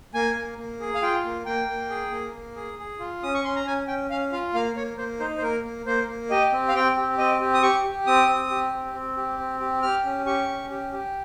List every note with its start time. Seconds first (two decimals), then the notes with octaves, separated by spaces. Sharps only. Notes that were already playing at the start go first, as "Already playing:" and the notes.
0.14 A#3 G#5
0.36 A#3
0.58 A#3
0.80 G#4
0.94 F5
1.02 F4 G5
1.25 A#3
1.46 A#3 G5
1.68 A#3
1.90 G#4
2.12 A#3
2.35 A#3
2.56 G#4
2.79 G#4
3.00 F4
3.23 C#4 D#6
3.34 C#6
3.44 C#4 C6
3.56 A#5
3.66 C#4 G#5
3.88 C#4 G5
4.10 C#4 F5
4.32 F4 F5
4.54 A#3 F5
4.76 A#3 C#5
4.98 A#3 C5
5.20 D#4 C5
5.38 C5
5.42 A#3 A#4
5.64 A#3
5.86 A#3 C5
6.08 A#3
6.30 G4 D#5
6.52 C4
6.68 F5
6.75 C4 G5
6.97 G4
7.18 C4 D#5
7.41 G4
7.54 D#6
7.63 G4 C#6
7.84 G4
8.07 C4 D#6
8.28 C4
8.50 G4
8.73 C4
8.94 C4
9.17 G4
9.39 C4
9.60 G4
9.82 G4 F6
10.05 C#4
10.26 G4 C#6
10.49 C#4
10.70 G4
10.93 G4